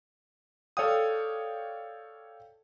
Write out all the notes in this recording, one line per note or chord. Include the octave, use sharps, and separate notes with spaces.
A4 C#5 D5 F5 G5 D#6